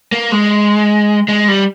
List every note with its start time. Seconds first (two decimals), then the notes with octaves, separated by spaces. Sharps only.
0.12 A#3
0.32 G#3
1.28 G#3
1.48 G3